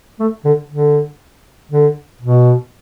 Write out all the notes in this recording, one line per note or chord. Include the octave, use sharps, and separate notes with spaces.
A3
D3
D3
D3
B2